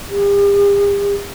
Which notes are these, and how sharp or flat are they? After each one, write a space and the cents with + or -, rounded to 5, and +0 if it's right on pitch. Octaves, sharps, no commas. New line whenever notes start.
G4 +45